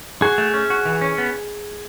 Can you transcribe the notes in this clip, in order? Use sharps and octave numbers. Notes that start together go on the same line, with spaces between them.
F#4 G#4
A3
C#4
F#4
E3
C#4
B3